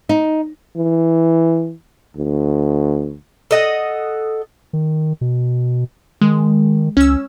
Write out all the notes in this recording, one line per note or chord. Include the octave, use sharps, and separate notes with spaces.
D#4
E3
D2
A4 D#5 F#5
D#3
B2
D#3 G#3
C#2 C#4 E6